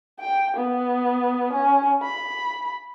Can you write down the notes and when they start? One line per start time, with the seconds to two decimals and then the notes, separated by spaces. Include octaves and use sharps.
0.20 G5
0.57 B3
1.53 C#4
2.03 B5